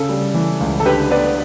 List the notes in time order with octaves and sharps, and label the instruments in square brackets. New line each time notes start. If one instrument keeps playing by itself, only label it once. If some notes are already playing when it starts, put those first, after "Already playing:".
Already playing: [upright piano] C#3 A4
G3
E3
C#2
A4
D3 G4 B4
B3 B4 D5